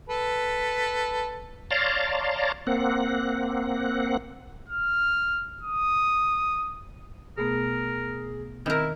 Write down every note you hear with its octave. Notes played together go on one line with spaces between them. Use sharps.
A4 B4
C#5 D5 F5 A5 A#5 C6
A#3 C4 F#5
F6
D#6
B2 A3 B3 G#4 A#4
D#3 C4 E4 A#4